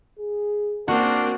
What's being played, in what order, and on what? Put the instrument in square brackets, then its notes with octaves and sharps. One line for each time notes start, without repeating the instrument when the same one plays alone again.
[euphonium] G#4
[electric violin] A#3 C4 [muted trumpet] D4 [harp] F#4 [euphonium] A#4